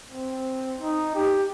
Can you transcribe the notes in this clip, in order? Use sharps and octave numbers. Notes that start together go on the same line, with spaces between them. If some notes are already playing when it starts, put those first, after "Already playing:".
C4
D#4
G4